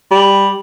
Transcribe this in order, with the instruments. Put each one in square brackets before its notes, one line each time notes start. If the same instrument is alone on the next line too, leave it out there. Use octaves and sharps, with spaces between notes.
[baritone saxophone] G3